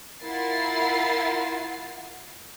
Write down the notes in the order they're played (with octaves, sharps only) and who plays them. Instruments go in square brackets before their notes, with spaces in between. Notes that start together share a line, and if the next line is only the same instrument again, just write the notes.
[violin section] E4 F4 A#4 F#5 A6 C7